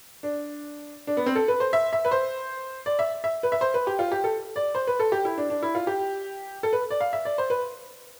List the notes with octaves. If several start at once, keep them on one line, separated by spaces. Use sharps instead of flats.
D4
D4
B3
C4
A4
B4
C5
E5
E5
B4
C5
D5
E5
E5
B4
E5
C5
B4
G4
F4
G4
A4
D5
C5
B4
A4
G4
E4
D4
D4
E4
F4
G4
A4
B4
D5
F5
E5
D5
C5
B4